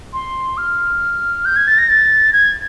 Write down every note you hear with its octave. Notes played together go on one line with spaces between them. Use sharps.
C6
F6
G6
G#6
A6
A#6
A6
G#6